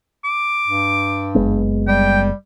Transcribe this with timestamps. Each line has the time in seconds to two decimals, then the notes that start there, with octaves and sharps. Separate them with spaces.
0.25 D6
0.68 G2
1.35 F#1 G#3 B3
1.88 G3 G5